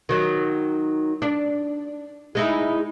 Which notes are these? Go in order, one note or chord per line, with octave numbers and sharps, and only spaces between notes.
D#3 F#3
D4
G#3 D#4 E4